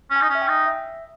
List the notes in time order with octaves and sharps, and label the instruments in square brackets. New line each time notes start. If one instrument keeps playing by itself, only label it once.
[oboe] C#4
[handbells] G#5
[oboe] D#4
C#4
[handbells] E5
G5
[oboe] D#4
[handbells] E5